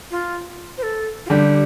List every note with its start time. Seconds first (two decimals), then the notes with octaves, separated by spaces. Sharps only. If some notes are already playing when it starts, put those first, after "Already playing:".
0.11 F4
0.78 C5
0.83 A4
1.26 F4
1.30 D3 G3 G4